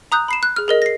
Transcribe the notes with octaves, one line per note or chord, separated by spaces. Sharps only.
A#5 D#6 F#6 G6
B5 C7 E7
F#6
G#4 F6
G#4 A#4 D#5
A#6 C7